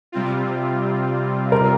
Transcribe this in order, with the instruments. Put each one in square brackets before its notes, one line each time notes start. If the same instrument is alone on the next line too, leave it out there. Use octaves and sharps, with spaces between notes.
[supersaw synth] C3 G3 C4 F4
[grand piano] A#4